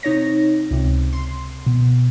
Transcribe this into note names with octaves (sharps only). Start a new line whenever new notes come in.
C3 D#4 C#5 A#6
C#2 C3
C6
B2